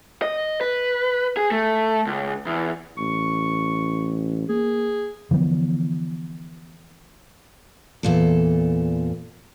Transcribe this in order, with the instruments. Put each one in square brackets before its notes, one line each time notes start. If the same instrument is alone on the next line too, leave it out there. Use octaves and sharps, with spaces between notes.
[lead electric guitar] D#5
B4
G#4
A3
C#2
E2
[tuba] A1 [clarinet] C#6
[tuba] A#3 [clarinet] G#4
[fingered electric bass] D3 E3 F3 B3
[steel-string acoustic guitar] E2 A#2 A4